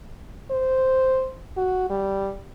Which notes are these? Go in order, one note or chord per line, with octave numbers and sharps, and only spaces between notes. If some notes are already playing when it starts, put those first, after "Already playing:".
C5
F#4
G3